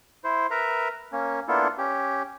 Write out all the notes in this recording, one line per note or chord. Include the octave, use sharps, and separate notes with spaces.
E4 C5
A#4 B4 E5 A#5
A#3 C#4
A#3 B3 D4 E4 F4 A4
C#4 G4